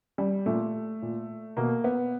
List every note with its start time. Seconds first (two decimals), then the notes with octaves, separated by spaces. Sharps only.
0.18 G3
0.46 A#2 A3
1.02 A#2
1.57 B2 A#3
1.84 B3